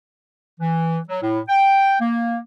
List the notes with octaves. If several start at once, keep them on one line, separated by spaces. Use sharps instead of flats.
E3
F#3
A2
G5
A#3